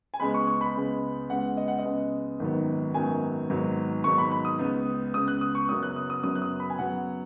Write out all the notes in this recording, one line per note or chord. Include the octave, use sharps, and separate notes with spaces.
G#5
C#2 C#3 G#3 B3 B5
C#6
C#6
B5
C#2 C#3 G#3 B3
C#2 C#3 G#3 B3 F#5
D#5
F#5
D#5
C#2 C#3 G#3 B3
G#1 F#2 D#3 F#3 B3
G#1 F#2 D#3 F#3 B3 G#5
G#1 G#2 F#3 B3
G#1 G#2 F#3 B3 C#6
B5
B5
D#6
C#2 C#3 B3
C#2 C#3 B3 D#6
F#6
D#6
C#6
F#1 F#2 F#3 B3 D#6
F#6
D#6
D#6
F#1 F#2 F#3 B3 D#6
F#6
D#6
B5
G#5
F#2 C#3 F#3 B3 F#5